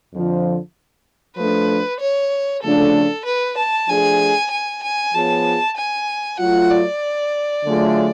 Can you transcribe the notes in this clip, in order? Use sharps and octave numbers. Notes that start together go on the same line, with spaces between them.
F2 D3 F3
F3 A3 D4 B4
C#5
C#3 F3 A3 D4 F4 A4
B4
A5
F3 A3 D4 G#4 G#5
G#5
G#5
F3 B3 F4 G#4 C#5 A5
G#5
F#3 A3 F4 F#5
D5
D3 F#3 A3 F4 G#4